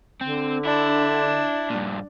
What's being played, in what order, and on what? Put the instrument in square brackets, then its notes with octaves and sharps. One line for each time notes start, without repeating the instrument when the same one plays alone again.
[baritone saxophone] D3 [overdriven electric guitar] C4
[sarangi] D4 [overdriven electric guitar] E4
[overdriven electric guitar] G2 A#2